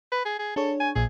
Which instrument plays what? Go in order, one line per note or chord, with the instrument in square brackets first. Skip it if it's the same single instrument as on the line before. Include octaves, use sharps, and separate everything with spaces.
[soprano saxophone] B4
G#4
G#4
[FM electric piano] D4 G#4 C#5 [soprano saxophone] A4
[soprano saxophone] G#5
[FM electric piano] A#1 A#2 [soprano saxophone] G#4